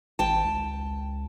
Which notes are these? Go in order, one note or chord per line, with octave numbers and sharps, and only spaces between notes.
G#1 G5 A5
C#2